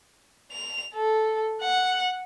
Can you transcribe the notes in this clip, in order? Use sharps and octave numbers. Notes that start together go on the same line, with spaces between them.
F7
A4
F#5